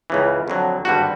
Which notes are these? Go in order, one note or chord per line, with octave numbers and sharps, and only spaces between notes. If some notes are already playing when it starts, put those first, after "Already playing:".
C#2 C#3 E3
F2 D3 F#3
G#1 G2 D3 G3 F#4